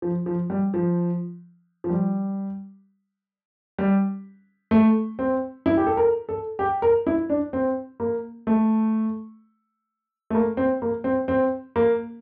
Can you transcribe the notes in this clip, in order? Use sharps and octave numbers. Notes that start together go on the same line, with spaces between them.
F3
F3
G3
F3
F3
G3
G3
A3
C4
E4
G4
A4
A#4
A4
G4
A#4
E4
D4
C4
A#3
A3
A3
A#3
C4
A#3
C4
C4
A#3